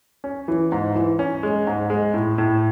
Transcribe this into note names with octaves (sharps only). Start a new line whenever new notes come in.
C#4
E3
G#2
E3
C#4
G#3
G#2
G#3
A2
A2